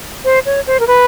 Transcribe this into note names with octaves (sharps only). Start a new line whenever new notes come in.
C5
C#5
C5
A#4
B4